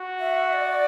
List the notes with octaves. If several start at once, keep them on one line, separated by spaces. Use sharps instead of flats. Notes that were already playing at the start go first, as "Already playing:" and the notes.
Already playing: F#4
E5
D5